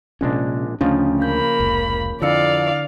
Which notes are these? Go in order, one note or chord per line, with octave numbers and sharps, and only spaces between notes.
A#1 C3 G#3 C#4 D4
D2 C#3 F3 A3 C#4 D4
A#3 B5 G6
F1 C#2
F2 D3 E4 D5 F5 E6 C#7